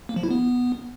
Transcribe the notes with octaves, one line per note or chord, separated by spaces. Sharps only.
A#3
F3
E4
B3